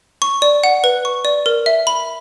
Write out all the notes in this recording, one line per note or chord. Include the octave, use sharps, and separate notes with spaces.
C#6
D5
F#5
B4
C#6
D5
A#4
E5
B5